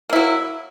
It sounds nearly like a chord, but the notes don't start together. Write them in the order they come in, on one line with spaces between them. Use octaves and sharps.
A#3 E4 F#3